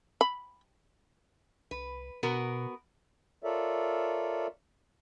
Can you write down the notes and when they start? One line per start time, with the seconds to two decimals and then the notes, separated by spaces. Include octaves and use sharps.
0.21 B5
1.71 C2 B4
2.23 B2 B3 F#4 A#4
3.43 F4 A4 A#4 C#5 D5 E5